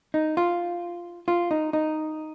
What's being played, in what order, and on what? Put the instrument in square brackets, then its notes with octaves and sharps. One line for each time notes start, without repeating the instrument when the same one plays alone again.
[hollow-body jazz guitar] D#4
F4
F4
D#4
D#4